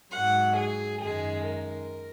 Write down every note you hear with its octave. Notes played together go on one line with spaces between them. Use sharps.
G#2 F#3 F#5
G#4
F#2 D#3 G#3 G#4
A#4